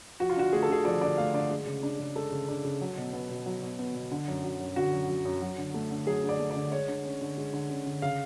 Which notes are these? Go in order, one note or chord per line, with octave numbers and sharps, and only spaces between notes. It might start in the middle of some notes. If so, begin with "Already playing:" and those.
F3 F#4
F4
D4 F#4
A3 G#4
A4
D3 G#4
F3 D5
D4 D5
A3 F5
D3 D5
G#3
C#3
D4
C#3
G#3 A4
C#3
D4
C#3
F#3
B2
B3
B2
F#3
B2
B3
B2
D3
F#2
F#3
F#2
D3 F#4
F#2
F#3
F#2
F#3
D3
A3
D3
F#3 G#4
D3
D5
A3
D5
D3
G#3 C#5
D3
C#4
D3
G#3
D3
C#4
D3
C#3 F5